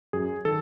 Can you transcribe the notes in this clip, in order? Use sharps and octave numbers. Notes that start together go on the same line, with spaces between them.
F#2 G#4
D#3 A4